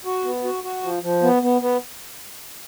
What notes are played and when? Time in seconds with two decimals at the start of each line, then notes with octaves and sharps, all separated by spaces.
0.05 F#4
0.24 B3
0.44 F#4
0.64 F#4
0.83 F3
1.03 F3
1.22 B3
1.42 B3
1.61 B3